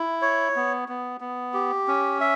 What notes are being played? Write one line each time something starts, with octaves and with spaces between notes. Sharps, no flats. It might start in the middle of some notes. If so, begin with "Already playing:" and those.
Already playing: E4
C#5
B3
B3
B3
G4
C#4
E5